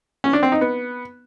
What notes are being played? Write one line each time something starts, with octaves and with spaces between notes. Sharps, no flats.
C#4
D4
C4
D#4
B3